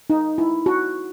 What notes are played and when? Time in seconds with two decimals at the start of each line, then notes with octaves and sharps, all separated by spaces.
0.10 D#4
0.38 E4
0.66 F#4